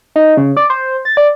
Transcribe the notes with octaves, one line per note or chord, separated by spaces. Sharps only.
D#4
C#3
D5
C5
A6
D5